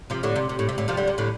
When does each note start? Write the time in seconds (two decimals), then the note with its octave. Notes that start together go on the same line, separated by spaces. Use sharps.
0.10 C3 F3
0.23 A2 D3
0.36 C3
0.49 C3
0.59 A2
0.69 C3
0.78 A2 D3
0.88 C3 F3
0.97 D3 G3
1.07 C3
1.18 A2 D3